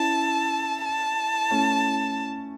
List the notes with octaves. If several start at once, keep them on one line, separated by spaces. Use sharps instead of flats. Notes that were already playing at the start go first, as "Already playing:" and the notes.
Already playing: C#4 E4 A5
A5
A3 C#4